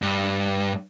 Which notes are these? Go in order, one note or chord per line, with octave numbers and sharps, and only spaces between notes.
G2